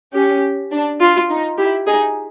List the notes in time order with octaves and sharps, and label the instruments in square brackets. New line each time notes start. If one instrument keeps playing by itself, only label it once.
[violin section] C#4 [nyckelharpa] G4
[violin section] D4
[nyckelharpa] F4
[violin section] D#4
[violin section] E4 [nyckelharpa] G4
[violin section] D#4 [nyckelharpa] G#4